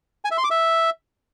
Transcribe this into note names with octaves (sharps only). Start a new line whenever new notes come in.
G#5
E5
C6
D6
E5